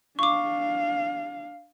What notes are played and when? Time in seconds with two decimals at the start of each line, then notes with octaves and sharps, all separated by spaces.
0.19 D4 F5 C#6 D6